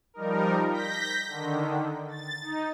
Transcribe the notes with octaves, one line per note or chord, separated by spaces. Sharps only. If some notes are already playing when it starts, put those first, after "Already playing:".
F3 G3 D#4 A#4
G6 A#6 B6
D3 D#3
A6
D#4